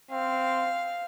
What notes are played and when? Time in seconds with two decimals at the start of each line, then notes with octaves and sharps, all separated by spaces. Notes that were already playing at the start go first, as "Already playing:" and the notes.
0.11 C4 F5